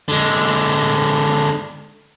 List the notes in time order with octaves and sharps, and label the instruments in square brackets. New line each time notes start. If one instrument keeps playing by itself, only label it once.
[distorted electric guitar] D3 G#3